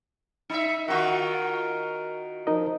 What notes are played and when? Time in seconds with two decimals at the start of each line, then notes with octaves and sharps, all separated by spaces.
0.50 D#4 E5
0.88 D#3 F4 F#4 A#4
2.47 F3 D#4 A#4 D#5